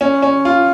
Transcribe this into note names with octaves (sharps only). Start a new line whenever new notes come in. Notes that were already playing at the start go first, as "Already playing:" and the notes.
C#4
C#4
F4